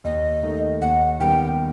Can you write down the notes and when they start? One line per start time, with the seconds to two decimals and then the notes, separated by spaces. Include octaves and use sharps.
0.04 D#2 D#5
0.43 D#3 A3 D#4
0.82 D#2 F#5
1.20 D#3 G3 B3 G5